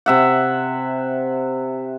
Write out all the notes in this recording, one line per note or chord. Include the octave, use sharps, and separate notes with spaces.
C3 E5 F#5